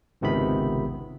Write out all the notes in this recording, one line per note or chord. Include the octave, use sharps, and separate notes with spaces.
G#1 C#2 C3 D#3 B3 B5